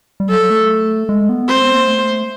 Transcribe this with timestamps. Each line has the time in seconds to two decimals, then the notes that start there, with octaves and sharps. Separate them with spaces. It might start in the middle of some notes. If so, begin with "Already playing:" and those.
0.20 G3
0.30 F#3 A4
0.50 A3
1.09 G#3
1.29 B3
1.49 C4 C5
1.62 B3
1.75 A#3
1.87 A3